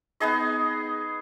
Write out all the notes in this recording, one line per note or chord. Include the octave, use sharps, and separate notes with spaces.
B3 D#4 G#4 D#5